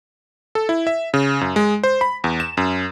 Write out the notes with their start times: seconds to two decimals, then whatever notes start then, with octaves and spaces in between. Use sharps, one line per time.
0.55 A4
0.69 E4
0.87 E5
1.14 C#3
1.41 F#2
1.56 G#3
1.84 C5
2.01 B5
2.24 E2
2.40 E7
2.57 F#2